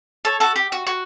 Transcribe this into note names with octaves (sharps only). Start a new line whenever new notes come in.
A4 C#5
F#4 A4
G4
F#4
F#4